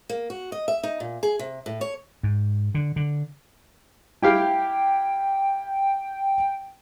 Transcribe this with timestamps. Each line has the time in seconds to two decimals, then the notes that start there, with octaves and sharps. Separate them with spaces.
0.09 A#3
0.30 F#4
0.52 D#5
0.68 E5
0.83 D#4
1.00 A#2
1.23 G#4
1.39 C3
1.66 A2
1.81 C#5
2.23 G#2
2.75 D3
2.96 D3
4.22 E4 G4 F5 G5